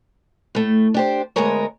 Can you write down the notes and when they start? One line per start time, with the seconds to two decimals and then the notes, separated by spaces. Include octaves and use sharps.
0.55 A2 A3
0.94 D4 G4 C5
1.36 D2 G#3 B3 G#4 A#4 C#5